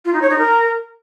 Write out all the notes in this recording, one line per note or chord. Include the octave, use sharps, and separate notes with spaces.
F4
D#4
C#5
D#4
A#4